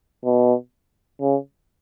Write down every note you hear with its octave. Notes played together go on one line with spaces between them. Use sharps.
B2
C#3